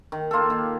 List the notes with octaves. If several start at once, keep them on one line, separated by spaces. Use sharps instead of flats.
D#3
A#3 F4 A4
D#3